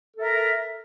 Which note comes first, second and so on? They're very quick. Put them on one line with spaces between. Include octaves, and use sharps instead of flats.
A4 E5 A#4